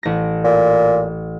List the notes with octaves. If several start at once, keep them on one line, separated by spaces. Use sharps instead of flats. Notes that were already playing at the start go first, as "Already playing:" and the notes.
A1 A#6
A#2